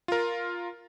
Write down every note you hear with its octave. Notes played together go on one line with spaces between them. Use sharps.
F4 A#4